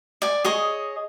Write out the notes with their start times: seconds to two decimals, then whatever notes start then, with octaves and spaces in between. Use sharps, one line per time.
0.22 D5 G#5
0.44 G#4 C#5 D#5